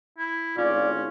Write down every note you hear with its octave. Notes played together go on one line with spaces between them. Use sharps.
E4
G#1 A2 C#4 F4 D5